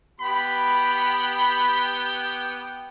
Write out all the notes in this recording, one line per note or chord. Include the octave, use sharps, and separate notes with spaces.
B3 G4 G5 B5